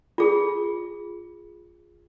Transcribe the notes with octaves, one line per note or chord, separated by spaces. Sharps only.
F4 G#4